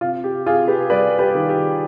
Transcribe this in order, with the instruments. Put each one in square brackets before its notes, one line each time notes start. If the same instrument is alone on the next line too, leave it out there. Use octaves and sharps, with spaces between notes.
[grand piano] C3 F4
G4
C3 F4 G#4
G4 B4
G3 B4 D5
G4 B4
D#3
G4